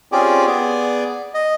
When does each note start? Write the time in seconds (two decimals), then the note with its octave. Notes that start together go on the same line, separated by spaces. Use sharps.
0.12 C4 C#4 F4 G4 G#4 D5
0.47 B3 G#4 D5
1.34 D#5